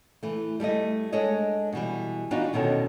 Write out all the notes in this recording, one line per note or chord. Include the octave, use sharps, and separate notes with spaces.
E3 A3
G3 A3 E4 D#5
G#3 D4 A4 C#5 D#5
B2 E3 G3
E3 B3 D4 D#4 F4 F#4
E2 B2 D#3 C#4 D4 A4